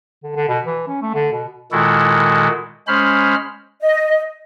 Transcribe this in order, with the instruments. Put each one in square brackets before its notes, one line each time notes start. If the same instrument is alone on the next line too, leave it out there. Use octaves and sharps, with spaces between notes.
[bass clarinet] D3
D3
B2
E3
C#4
A3
D3
B2
[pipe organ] A#2 D#3 G#3 E4 F#4 A4
G#3 C#4 C5 B5 F6
[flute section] D#5